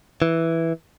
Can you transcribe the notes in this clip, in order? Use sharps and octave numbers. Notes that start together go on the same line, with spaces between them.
E3